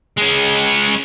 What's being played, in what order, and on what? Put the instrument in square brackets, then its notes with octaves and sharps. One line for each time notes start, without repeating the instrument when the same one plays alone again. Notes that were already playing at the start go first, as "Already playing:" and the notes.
[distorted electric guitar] G#3 C#4